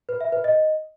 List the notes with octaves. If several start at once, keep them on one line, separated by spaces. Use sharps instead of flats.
B4
E5
B4
D#5